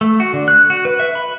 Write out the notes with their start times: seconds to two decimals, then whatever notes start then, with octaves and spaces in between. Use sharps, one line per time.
0.01 A3
0.20 F#4
0.34 D3
0.48 F#6
0.70 F#4
0.85 B4
1.00 E5
1.15 B5